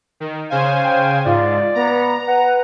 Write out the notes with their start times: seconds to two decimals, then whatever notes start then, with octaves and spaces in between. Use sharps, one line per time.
0.20 D#3
0.50 C#3 C5 F5 G#5
0.84 G5
1.25 G#2 F4 D5
1.75 B3 A#5
2.27 B4 F#5